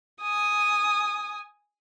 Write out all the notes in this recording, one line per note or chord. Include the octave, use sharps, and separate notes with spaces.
G#5 D#6